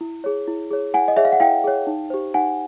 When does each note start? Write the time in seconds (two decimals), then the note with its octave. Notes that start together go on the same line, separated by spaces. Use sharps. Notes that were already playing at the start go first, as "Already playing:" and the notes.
0.01 E4
0.24 G#4 C#5
0.47 E4
0.71 G#4 C#5
0.94 E4 F#5 G#5
1.08 D#5
1.17 G#4 C#5 E5
1.25 F5
1.32 F#5
1.40 E4 F5 G5
1.64 G#4 C#5
1.87 D#4
2.10 G4 C5
2.34 D#4 F#5 G#5